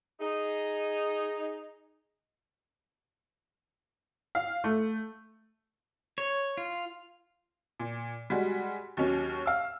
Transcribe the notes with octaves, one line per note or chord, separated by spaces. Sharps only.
D#4 G#4
F5
A3
C#5
F4
A#2
G3 G#3 F#4
D#2 F#3 C#4
F5 E6